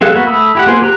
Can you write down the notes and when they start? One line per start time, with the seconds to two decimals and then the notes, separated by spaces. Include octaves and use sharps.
0.01 G3 G#4 A4 F5 F#6
0.14 A#3 B3 F#4
0.27 A3 B5 D#6 E6
0.55 E4 G4 F#5
0.67 A#3 B3 F4 G#4 C5
0.82 G4 A#5 F#6